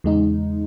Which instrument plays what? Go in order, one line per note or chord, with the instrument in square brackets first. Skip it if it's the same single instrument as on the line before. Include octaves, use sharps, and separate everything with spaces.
[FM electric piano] E2 C#3 G#3 D#4